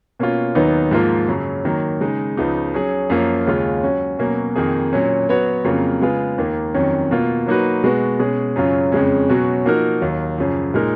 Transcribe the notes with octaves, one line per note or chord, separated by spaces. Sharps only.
B2 A#3 C#4 F4
D#2 D#3 F#3 B3 D#4
G#2 F3 A#3 F4
F#2 C#3 F#3
D#3 F#3 A#3
C#3 G#3 D#4
C#2 C#3 F3 B3 D#4
F#3 C#4 G#4
F#2 F3 A#3 F4
D#2 C#3 G#3 C#4 F4
F#3 C#4 F#4
B2 F#3 A#3 C#4
F2 D#3 A#3 D#4 G#4
A#2 F#3 C#4
F#3 B3 F#4 C#5
F2 C#3 F#3 A#3 F4
C#3 G#3 B3 F4 G#4
D#2 D#3 A#3
F2 D#3 F#3 C#4
B2 A#3 F4
F#3 A#3 D#4 F#4 B4
B2 G#3 B3 F#4
B2 G#3 C#4 G#4
F#2 C#3 F#3 C#4 F4
F2 C#3 G#3 C#4
B2 F#3 C#4 F#4
F3 A#3 D#4 F#4 A#4
D#2 D#3 F#3
F#2 C#3 F3
A#2 G#3 D#4 A#4